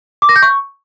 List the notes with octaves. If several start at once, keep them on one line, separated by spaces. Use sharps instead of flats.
D6
A#6
G6
C#6